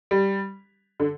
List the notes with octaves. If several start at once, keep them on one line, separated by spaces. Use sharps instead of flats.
G3
D3